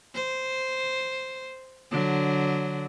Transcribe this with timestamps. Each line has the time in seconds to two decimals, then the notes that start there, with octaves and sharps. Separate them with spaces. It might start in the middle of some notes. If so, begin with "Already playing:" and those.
0.15 C5
1.91 D3 F#3